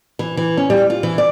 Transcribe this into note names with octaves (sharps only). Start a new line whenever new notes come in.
E3
E3
C#4
G3
F4
E3
D5